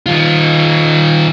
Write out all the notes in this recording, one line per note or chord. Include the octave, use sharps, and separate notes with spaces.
D#3 F4